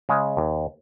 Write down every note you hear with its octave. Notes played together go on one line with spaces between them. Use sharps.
C#3 G#3
D#2